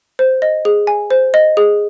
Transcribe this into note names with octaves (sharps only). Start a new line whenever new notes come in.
C5
D#5
G#4
G#5
C5
D#5
G#4